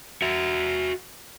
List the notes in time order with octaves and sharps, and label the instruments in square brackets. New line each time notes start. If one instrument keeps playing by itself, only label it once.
[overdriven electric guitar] F#4 E5